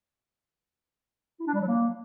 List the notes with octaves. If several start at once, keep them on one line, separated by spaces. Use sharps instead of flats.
E4
D4
G3
F#3
A#3